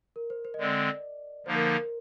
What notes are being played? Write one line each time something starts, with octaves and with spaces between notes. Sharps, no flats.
A#4
C5
C5
D#5
D3 G#3 C4 D5
D3 F3 A#3 D#4 C5
A#4
C5